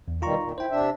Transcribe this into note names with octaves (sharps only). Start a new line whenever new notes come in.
E2
B2 D#3 G3 F4 A#5 C#6
A#2 D#3
E4 C5 G5
C3 D4 E5